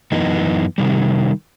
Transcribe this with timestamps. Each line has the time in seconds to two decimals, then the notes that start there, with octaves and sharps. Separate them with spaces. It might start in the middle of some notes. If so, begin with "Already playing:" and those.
0.12 F#2 E3 B3 D#4
0.78 C3 D#3 G3